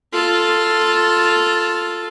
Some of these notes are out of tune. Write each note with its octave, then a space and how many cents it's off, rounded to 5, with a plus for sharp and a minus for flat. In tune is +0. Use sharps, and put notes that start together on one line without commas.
F4 +0 A4 +0